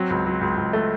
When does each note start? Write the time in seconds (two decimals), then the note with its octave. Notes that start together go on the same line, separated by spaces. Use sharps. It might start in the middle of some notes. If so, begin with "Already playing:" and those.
Already playing: F#3 C4
0.10 C#2
0.26 F#3
0.41 C#2
0.58 C#2
0.73 A3